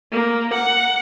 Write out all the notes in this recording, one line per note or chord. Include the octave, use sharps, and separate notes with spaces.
A#3
F#5